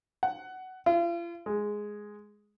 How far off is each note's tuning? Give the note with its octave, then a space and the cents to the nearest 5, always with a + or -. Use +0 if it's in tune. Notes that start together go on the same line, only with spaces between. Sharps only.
F#5 +15
F4 -40
G#3 +0